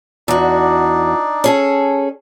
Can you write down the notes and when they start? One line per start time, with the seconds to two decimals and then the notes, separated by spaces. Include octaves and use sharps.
0.28 E2 D4 D#4 F#4 D5
1.44 C#4 G#4 A4